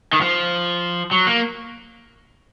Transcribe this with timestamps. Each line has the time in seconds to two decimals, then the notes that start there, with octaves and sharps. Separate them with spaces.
0.13 D#3
0.21 F3
1.11 F#3
1.27 A#3